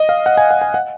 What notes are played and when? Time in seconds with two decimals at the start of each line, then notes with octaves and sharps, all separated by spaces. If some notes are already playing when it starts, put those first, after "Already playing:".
Already playing: D#5
0.09 F5
0.26 F#5
0.37 G#5
0.51 F#5
0.62 G#5
0.74 F#5